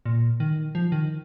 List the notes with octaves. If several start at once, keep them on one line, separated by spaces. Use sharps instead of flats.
A#2
D#3
F3
D#3